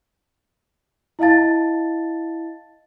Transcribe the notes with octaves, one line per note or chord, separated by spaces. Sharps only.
E4 D#5 F5 A5 A6